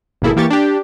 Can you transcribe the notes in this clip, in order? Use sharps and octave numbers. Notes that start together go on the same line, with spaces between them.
G#1 B2 A#3 E4 G#4 A4
E3 A#3 G4 C#6 A6
D4 G4